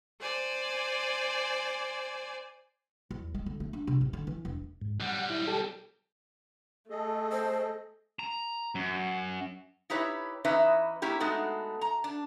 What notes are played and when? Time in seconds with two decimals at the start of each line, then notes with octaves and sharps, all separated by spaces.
0.21 C5 D5 G#5
3.11 E2
3.34 G#3
3.46 D3
3.60 A3
3.73 D4
3.87 C3
4.01 A1
4.13 D3
4.27 E3
4.45 E1
4.82 G#2
5.00 B1 G3 F#5
5.18 F#5
5.30 E4
5.47 G4 A4
6.90 A3 G#4 A4 D#5
7.32 C5
8.19 A#5
8.75 F#2
9.90 D#4 E4 G4 B4 C#5
10.44 E3 C#4 D#4 B4 D#5 E5
11.02 A#3 C#4 E4 G4
11.20 G#3 A3 B3 D#4 F#4
11.81 A#5
12.04 D4